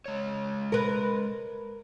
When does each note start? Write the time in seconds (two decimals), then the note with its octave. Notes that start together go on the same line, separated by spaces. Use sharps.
0.06 G#3 C#5
0.72 A#4 B4